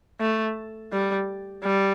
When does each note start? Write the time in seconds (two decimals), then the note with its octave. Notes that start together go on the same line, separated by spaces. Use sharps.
0.20 A3
0.92 G3
1.64 G3